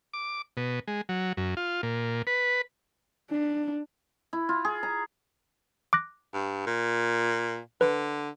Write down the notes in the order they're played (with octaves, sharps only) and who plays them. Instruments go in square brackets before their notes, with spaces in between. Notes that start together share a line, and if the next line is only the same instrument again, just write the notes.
[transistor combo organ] D6
B2
G#3
F#3
F#2
F4
A#2
B4
[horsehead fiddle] D4
[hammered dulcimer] E4
F4
G#4
A#5
[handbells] D6 F#6 A#6
[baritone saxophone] G2
A#2
[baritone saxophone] D3 [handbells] B4